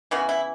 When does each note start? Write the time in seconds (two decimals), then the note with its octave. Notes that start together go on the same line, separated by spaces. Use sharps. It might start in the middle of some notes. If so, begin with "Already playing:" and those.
0.11 C#3 E3 B3 F#4
0.29 E4